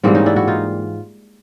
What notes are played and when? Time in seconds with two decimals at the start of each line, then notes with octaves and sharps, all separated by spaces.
0.03 G#2 E3 G3 A#3 C4
0.15 C#4 D#4
0.26 D4 E4
0.36 E4 F#4
0.48 D#4 F4